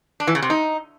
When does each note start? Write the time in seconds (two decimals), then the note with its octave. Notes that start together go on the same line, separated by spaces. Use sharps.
0.20 D4
0.27 E3
0.35 C#3
0.42 C3
0.50 D#4